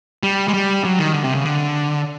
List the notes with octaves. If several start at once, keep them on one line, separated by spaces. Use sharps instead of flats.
G3
G#3
G3
F#3
D#3
D3
C3
C#3
D3